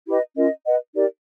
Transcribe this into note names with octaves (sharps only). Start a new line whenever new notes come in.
E4 G4 B4 D#5
C#4 F4 A#4 D#5
B4 D#5 F#5
D#4 G4 A#4 D5